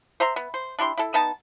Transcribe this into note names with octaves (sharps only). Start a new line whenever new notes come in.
C5 E5 A#5 C6
B3
C5
D4 E4 G4 C6
E4 A4
B3 D#4 A5